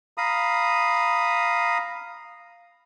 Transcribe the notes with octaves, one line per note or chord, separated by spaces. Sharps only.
F5 A#5 B5 D#6